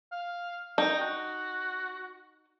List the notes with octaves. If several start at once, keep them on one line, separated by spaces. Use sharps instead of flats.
F5
D#4 G5
F#4